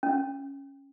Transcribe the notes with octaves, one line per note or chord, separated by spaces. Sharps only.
C#4